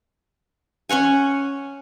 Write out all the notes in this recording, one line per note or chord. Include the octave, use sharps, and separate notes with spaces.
C#4 C#5 F#5 G#5